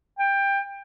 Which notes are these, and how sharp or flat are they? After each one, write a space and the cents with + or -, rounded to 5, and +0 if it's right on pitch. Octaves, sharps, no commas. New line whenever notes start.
G5 +20